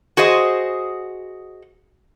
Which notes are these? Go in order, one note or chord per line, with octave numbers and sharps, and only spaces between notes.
F#4 G#4 C5 D#5